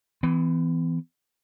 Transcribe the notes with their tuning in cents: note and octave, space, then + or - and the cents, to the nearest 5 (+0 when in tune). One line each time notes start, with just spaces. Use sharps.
E3 +0 B3 +45